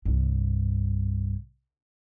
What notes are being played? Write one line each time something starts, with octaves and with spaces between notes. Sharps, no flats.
C2 G2